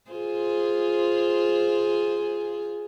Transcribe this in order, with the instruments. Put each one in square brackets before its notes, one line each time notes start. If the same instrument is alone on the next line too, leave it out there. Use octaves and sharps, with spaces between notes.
[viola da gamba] F4 G#4 C5